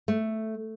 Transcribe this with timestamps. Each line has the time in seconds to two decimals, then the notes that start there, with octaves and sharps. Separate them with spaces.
0.08 A3